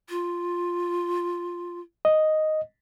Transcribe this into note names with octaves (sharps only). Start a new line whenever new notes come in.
F4
D#5